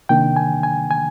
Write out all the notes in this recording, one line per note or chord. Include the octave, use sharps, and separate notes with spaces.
C3 D#3 A#3 D4 G5
G#5
G#5
G#5